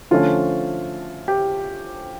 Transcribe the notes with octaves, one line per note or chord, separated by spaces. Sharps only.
D3 F3 A3 C#4 F4
G4